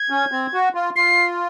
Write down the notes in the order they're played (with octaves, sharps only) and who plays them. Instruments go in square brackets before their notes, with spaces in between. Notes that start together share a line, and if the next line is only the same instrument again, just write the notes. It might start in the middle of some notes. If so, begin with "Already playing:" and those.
Already playing: [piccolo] G#6
[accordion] C#4
C4
F#4
F4
[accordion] F4 [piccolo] C7